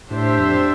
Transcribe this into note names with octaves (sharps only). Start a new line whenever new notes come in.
A2 D4 G4 C5 E5
F2